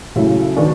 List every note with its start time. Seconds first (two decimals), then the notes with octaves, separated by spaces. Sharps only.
0.16 C#3 F#3 A3 E4
0.57 D#3 F#3 B3 D4